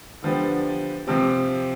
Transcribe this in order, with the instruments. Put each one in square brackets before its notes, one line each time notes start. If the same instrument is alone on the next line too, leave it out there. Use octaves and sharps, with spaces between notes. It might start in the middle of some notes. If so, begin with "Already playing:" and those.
[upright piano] D3 F3 B3 D4 G4
C3 F3 C4 G4